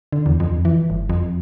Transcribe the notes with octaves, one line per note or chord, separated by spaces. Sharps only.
D3
E2
F2
E3
G1
F2